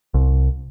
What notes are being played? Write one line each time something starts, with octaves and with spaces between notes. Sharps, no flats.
C2